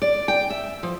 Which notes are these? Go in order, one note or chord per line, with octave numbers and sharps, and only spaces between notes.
D5
G5
E5
F3